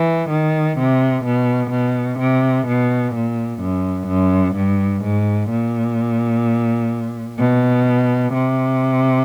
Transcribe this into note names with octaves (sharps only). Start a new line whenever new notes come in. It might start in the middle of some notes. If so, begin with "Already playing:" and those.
Already playing: E3
D#3
C3
B2
B2
C3
B2
A#2
F#2
F#2
G2
G#2
A#2
B2
C3